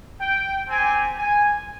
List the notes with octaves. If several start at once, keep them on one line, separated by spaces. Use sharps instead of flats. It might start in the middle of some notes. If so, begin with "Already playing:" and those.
G5
C4 G4 G#5
G#5